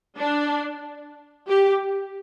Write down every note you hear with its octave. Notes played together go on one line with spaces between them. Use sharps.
D4
G4